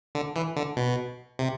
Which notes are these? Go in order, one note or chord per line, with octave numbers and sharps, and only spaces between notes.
D3
E3
D3
B2
C3